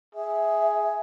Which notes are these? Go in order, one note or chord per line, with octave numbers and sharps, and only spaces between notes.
G#4 E5